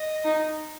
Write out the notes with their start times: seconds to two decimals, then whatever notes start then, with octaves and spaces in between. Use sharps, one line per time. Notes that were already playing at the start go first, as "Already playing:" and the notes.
Already playing: D#5
0.25 D#4